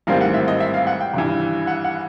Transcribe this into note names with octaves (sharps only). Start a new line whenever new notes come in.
A1 G#2 D#3 G3 C4 F5
F#5
E5
D#5
E5
F5
F#5
G5
G#1 G2 E3
F#5
F#5